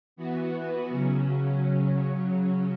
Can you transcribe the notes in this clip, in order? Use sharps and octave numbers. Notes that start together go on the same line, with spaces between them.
E3 B3 F#4
C#3 F#3 C#4